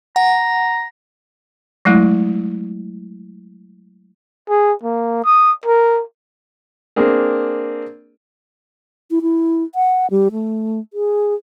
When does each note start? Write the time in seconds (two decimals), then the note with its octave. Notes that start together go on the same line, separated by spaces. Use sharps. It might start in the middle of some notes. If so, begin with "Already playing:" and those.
0.16 F#5 A#5
1.85 F#3 G#3 A3 E4
4.49 G#4
4.83 A#3
5.25 D#6
5.66 A#4
6.96 A#3 C4 D4 G#4 A#4
9.11 E4
9.22 E4
9.75 F#5
10.11 G3
10.32 A3
10.93 G#4